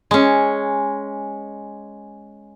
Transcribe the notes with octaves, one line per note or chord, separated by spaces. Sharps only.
G#3 C#4